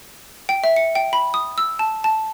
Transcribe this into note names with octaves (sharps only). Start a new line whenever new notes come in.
G5
E5
C#7
G5
B5
D#6
E6
A5
A5